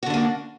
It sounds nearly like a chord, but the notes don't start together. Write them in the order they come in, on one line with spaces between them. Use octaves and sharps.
F#4 D3 D4 A#3